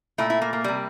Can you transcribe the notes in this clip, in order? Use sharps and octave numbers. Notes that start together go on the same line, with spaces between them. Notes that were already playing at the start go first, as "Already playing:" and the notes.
A#2 A3 E4
E4
A#3
A#3
C3 G3